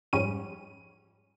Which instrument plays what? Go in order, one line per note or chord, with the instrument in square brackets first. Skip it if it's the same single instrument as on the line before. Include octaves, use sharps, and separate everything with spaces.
[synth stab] F2 G#2 G3 C#4 D#7